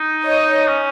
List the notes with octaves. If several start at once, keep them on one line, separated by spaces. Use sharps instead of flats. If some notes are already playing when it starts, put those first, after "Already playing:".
Already playing: D#4
C#5 D#5
C#4